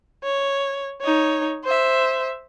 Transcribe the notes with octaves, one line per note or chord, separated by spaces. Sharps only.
C#5
D#4 C#5
C5 E5